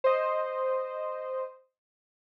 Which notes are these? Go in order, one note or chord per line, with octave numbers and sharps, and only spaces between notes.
C5 D#5